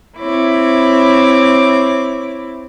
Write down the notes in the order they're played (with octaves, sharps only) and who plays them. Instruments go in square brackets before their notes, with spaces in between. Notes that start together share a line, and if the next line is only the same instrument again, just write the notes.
[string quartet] C4 E4 C#5 D6